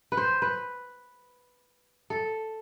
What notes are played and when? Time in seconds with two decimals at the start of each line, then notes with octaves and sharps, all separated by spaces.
0.12 B4
0.17 C5
0.42 B4
2.10 A4